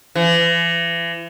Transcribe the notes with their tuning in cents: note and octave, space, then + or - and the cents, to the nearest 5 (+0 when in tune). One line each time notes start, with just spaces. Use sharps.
E3 +40